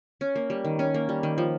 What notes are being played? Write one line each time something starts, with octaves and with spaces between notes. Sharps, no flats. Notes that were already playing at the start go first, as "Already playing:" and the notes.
C#4
A#3
G3
D#3
C#4
A#3
G3
D#3
F3